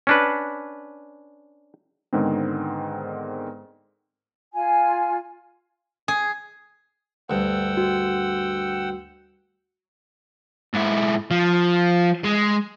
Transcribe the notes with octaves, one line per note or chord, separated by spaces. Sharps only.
C#4 D4 B4
G#2 D3 D#3 G#3 B3 C4
F4 G#5
G#4
D2 G2 F#5 G5 E6
F#4
G#2 E4
F3
G#3